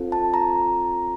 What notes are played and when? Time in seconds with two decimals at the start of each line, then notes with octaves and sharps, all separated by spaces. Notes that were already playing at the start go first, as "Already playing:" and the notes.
Already playing: C4 F4 A4
0.12 A5
0.34 A#5